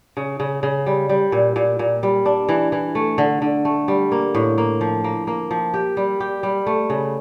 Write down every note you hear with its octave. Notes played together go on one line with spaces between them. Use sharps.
C#3
C#3
C#3
G3
G3
A#2
A#2
A#2
G3
D4
E3
E3
A3
D3
D3
A3
G3
A#3
A2
A#3
F3
A#3
A#3
F3
G4
G3
G4
G3
A3
C#3